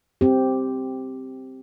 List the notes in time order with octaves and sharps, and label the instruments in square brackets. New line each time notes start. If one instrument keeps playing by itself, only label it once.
[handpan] C4 G4